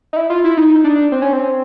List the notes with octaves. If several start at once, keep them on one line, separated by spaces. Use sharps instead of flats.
D#4
E4
F4
E4
D#4
D4
C4
C#4
C4